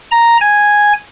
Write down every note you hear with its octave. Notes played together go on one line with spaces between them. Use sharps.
A#5
G#5